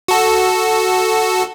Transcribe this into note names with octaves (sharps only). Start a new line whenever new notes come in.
F#4 A4